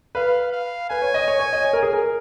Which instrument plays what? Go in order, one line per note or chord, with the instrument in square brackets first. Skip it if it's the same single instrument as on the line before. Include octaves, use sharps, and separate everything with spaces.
[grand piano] B4 [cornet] F5
[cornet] F5
[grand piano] B4 [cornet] G#5
[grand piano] C#5
D#5
C#5
C#5
D#5
C#5
A#4
G#4
A#4